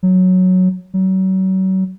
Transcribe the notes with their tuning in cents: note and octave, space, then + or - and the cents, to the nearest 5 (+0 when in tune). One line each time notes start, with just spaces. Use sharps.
F#3 -5
F#3 +35